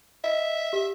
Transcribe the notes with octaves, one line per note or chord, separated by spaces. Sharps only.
D#5 E5
G4